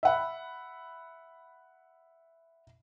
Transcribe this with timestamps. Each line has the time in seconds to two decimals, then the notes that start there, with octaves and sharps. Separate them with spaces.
0.03 E5 F#5 B5